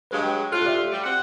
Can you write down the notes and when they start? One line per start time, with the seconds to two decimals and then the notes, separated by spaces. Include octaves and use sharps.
0.11 G2 F#3 G#3 B4 F5
0.23 G5
0.52 A2 F3 F4 A4 F6 F#6
0.65 G4 D5 E5
0.92 G3
1.04 C4 F#5